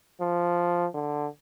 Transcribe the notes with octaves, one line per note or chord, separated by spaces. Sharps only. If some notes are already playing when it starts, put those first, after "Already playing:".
F3
D3